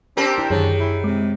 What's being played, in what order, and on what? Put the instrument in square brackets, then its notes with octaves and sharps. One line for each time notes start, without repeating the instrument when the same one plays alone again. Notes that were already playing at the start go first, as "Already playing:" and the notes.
[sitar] C4 G4 A#4 [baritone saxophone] D4
[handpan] E4
[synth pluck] F#2 [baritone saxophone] D3 [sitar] D#3 [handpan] G#4 C#5
[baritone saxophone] E4
[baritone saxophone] C3 [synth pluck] G#3